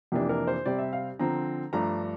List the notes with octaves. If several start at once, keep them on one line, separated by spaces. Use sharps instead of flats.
F2 C3 E3 A#3 D4 G4
A#4
C5
C3 G3 C4 D5
E5
F5
D3 F3 C4 A#5
G2 F3 A3 D4 A#5